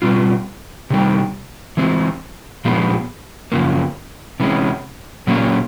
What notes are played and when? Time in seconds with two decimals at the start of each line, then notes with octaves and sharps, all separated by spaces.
0.02 B2 G3 C4 F4
0.90 C3 D#3 G3
1.77 E3 G#3 C4
2.65 A#2 F3 G#3 B3
3.52 F#2 C#3 F3 A#3
4.40 C3 E3 G#3 C#4
5.27 A#2 F#3 A#3 C#4